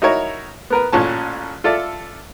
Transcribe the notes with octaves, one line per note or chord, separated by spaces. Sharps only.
D#4 E4 F#4 A#4 C#5
B3 A#4 B4
A1 A#2 C#4 A5
F4 A4 D5 E5